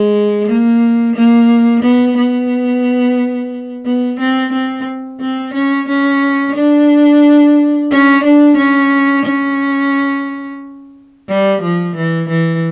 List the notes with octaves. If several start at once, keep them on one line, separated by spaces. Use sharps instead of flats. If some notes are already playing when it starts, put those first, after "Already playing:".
Already playing: G#3
A#3
A#3
B3
B3
B3
C4
C4
C4
C#4
C#4
D4
C#4
D4
C#4
C#4
G3
F3
E3
E3